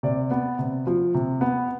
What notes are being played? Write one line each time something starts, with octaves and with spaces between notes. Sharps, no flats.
C3 D5
B3
C3
F3
C3
B3